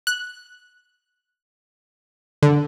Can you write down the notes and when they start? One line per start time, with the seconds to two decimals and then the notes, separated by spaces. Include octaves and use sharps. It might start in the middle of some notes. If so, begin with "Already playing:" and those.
0.07 F#6
2.43 D3